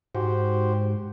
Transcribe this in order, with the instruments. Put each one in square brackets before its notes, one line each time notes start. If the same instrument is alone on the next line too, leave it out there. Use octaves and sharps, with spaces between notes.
[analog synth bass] G#2 [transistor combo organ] F#4 G4 C5